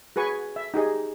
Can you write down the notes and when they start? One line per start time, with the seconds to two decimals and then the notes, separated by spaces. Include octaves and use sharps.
0.16 F#4 G#4 B4 G#5 C#6
0.56 E5
0.74 D#4 G4 G#4 D#5